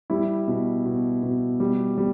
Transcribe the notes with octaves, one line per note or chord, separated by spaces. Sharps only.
G3 E4
B2
B2
B2
G3
G3